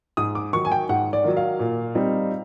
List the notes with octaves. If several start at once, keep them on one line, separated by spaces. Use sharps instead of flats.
G#2 D#6
D6
D#3 F#3 C#6
G#5
G5
G#2 F#5
D5
D#3 F#3
F5
A#2
G3 C4 D#4